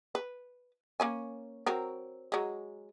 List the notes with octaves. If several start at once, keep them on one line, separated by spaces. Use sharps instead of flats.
B4
A#3 C#4 G#5
F#3 C4 A#4
F#3 G#3